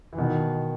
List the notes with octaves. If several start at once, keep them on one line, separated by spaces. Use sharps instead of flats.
E3
B2 D#3